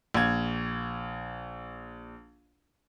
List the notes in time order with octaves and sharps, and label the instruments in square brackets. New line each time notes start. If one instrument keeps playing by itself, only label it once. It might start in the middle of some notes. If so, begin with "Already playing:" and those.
[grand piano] A#1 G#6